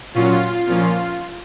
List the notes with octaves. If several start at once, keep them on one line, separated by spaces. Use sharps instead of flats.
A#2 F#3 C#4 F4
A#2 F3 A#3 C#4 F4